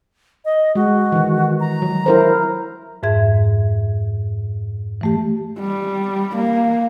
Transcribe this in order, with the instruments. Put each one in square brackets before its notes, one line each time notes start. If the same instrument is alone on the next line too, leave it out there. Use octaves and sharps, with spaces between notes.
[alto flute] D#5
[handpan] G#3 [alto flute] F#4
[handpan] D#3 E3
[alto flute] A#5
[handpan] F#3
E4 A#4 C5
[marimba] F2 G#2 G#4 E5 G#6
E3 A3 G4
[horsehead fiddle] G3
A#3